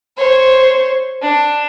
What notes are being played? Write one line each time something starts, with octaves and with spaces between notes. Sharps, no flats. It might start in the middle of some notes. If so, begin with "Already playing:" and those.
C5 C#5
D4